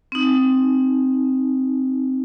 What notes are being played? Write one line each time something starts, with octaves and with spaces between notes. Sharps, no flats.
C4 D#4